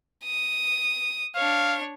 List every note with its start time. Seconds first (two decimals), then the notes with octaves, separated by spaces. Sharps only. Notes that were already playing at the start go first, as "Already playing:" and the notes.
0.24 D#6
1.35 D4 C#5 F5